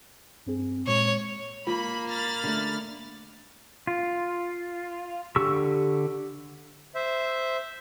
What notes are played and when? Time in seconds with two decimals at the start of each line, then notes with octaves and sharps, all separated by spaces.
0.46 G2 C4 G#4
0.87 A#2 G#3 C#5
1.67 A#3 F4 B5
2.08 B5 F6 A6
2.44 D3 A3
3.87 F4
5.36 D3 G4 C#6 E6
6.95 C5 E5